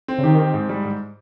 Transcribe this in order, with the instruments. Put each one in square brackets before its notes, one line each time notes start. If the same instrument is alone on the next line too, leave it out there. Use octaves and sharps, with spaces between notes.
[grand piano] C4
[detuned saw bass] C#3
[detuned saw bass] D#3 [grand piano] G4
[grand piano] C4
G#2
G3
G#2